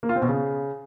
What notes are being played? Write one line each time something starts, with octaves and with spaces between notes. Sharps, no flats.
A#3
F4
C4
B2
C#3